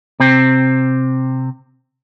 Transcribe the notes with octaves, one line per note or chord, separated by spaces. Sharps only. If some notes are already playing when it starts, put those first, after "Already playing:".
C3 C4